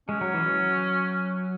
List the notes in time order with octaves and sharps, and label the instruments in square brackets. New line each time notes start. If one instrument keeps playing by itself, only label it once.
[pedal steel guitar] G#3 [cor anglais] C#4
[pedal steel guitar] F#3
E3
F#3